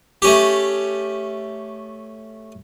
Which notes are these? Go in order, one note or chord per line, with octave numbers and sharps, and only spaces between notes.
A3 C#4 G4